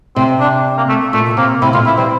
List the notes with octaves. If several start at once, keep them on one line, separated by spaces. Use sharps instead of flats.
C3 C4
D4
A#3
A3
A#2 A3
C3 A#3
C3 E4
A#2 D3 F4
C3 E4
E3 G3 C4